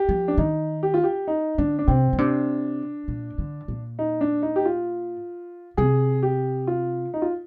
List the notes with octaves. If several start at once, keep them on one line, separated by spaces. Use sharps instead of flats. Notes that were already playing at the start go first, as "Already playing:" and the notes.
Already playing: G4
F3
D4
D#3 D#4
G4
F4
G4
D#4
D3 D4
D4
C3 C4
D3
C3 D4
A#2
D3
A#2
D#4
D4
D#4
G4
F4
C3 G#4
G4
F4
D#4
F4